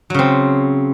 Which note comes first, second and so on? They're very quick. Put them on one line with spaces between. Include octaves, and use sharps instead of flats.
F#3 C#3 C4